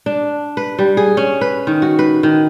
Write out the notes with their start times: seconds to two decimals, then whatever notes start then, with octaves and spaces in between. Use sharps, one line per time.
0.06 D4
0.57 B4
0.79 G3
0.97 G#4
1.17 C#4
1.41 B4
1.67 D#3
1.82 F#4
1.99 B4
2.23 D#3